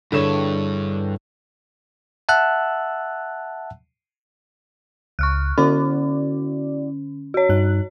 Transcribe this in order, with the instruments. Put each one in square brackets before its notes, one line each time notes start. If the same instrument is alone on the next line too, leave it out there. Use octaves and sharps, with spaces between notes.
[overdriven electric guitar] G2 [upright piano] D3 E7 [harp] E4 G#4 C#5
[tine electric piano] E5 F#5 A5 E6 F#6
[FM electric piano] C#2 [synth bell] C#6 F6 F#6
[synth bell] D3 C#4 [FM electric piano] E4 F#4 D5
[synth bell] F#4 C#5
[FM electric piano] G2 D#4 F#6